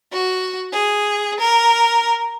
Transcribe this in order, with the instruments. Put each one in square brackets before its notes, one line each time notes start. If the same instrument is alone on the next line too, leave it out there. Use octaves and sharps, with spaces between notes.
[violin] F#4
G#4
A#4